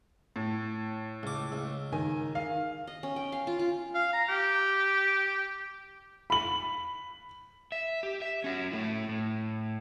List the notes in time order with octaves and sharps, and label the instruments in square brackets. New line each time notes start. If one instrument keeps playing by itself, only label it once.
[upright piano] A2
[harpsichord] C#2 D6
C#2
[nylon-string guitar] D#3 [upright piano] G#5
[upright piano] F5
[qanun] D#5
C#4
G5
F5
F4
F4
[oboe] F5
A#5
G4
[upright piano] B5 F#7
[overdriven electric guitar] E5
G4
E5
C#4 F#4
A3 E4
A2